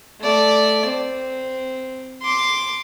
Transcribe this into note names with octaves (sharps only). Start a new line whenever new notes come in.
A3 D5
C4
C6 D6